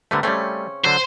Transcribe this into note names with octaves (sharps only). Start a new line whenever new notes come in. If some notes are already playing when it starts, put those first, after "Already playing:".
D3 G3 A3 B3 C4 A#4
C#3 G3 A3 C4 C#4
D3 F#3 C5